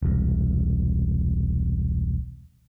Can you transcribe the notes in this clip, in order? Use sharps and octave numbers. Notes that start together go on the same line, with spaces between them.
E1 C2